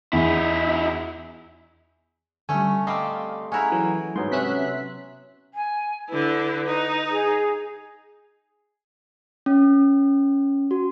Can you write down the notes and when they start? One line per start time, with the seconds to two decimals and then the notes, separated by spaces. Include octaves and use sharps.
0.13 E2 D#4 E4
2.49 D3 G3 A3 C#4 G#5
2.87 G3 C4 D#5 F5 C6 D6
3.52 C#4 E4 G#4 C#5 F#5 A#5
3.72 E3 F#3
4.16 G#2 F#3 B3 C6
4.32 C3 C#4 E5 F#6 B6
5.54 G#5
6.09 D3 E4 B4
6.67 D#4
7.11 G#4
9.46 C#4
10.71 F#4